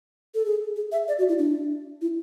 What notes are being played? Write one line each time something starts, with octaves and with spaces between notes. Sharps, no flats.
A4
G#4
G#4
E5
D5
F#4
E4
D4
E4